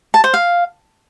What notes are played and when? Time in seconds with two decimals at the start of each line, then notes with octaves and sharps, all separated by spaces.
0.14 A5
0.24 C5
0.34 F5